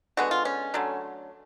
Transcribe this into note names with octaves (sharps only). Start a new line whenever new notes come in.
D3 G#3 B3 F#4
F4
C#4
D3 F#3 A3